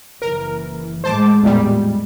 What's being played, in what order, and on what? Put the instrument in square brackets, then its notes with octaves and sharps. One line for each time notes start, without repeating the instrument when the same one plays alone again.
[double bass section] F#1 E3 [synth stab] A#4
[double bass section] A2 G#3 [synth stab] C5 A5 D6
[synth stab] E2 A#2 G3